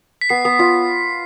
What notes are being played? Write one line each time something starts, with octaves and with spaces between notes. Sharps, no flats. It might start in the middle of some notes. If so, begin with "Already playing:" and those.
B6
B3 C7
B3
F4